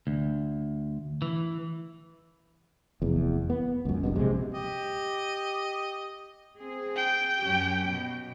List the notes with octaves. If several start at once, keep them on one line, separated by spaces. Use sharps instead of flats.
D2
E3
F1 E2
B3
C#2 F#2
F#1 C2 G2 B2
A#1 C3 G#3
G4 D#5
C4 G#4
G5
F#2 C#4 G4
B2